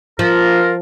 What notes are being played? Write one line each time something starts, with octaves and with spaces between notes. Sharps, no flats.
F3 F4 A#4